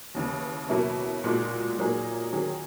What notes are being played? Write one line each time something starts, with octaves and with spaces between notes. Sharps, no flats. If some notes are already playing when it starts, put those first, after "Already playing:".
D#2 C#3 E3
B2 F#3 A#3 C#4 E4
A#2 G#3 D#4 F#4
A#2 F#3 A#3 D#4 G#4
D#3 F#3 C#4 G#4